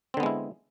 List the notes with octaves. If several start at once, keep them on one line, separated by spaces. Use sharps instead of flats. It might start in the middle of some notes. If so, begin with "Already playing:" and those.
D3 G#3 B3 C4 E4